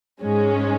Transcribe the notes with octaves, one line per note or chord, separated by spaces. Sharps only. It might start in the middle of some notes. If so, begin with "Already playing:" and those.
G#2 G#3 C#4